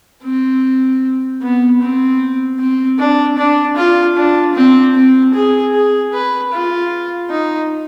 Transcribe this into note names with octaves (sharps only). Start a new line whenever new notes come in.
C4
B3
C4
C4
D4
D4
F4
D4
C4
C4
G#4
G#4
B4
F4
D#4